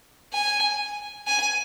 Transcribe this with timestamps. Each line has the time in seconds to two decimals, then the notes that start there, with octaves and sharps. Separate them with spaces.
0.33 G#5
1.27 G#5